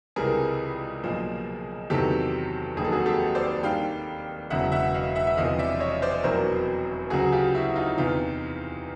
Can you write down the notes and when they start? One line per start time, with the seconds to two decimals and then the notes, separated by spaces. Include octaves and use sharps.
0.16 C#2 C3 E3 G3 G#4 A#4
1.04 B1 A#2 F3
1.90 E2 C3 D#3 F#3 G4 A4
2.76 F1 D#2 D#3 F#3 G#4
2.84 A4
2.92 F#4 G#4
3.06 G4 A4
3.35 C5 D5
3.63 D#2 D#3 G3 F5 G5
4.50 E1 E2 C#3 F#3 E5 F#5
4.72 E5 F#5
4.94 D#5 F5
5.15 E5 F#5
5.27 E5
5.37 E1 E2 C3 F3 D#5 F5
5.59 D5 E5
5.80 C#5 D#5
6.02 C5 D5
6.23 F1 E2 B2 F#3 A#4 C5
7.10 D2 C#3 F#3 F#4 G#4
7.32 F4 G4
7.54 E4 F#4
7.76 D#4 F4
7.97 E2 C3 E3 D#4 F4